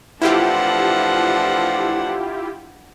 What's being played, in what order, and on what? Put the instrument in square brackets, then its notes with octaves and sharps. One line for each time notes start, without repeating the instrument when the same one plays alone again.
[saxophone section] A2 E3 F3 [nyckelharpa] D4 F#5 [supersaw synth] E4 F4 G4